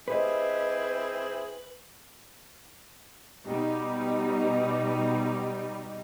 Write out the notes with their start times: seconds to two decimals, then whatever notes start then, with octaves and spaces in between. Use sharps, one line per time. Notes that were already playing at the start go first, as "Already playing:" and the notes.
0.08 C4 E4 G4 G#4 B4 C5 D#5
3.45 B2 G3 D#4